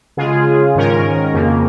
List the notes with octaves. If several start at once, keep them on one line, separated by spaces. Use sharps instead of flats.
C#3 G#3 F4 G#4
G#2 D#3 C#4 A#4
F2 C#3 A#3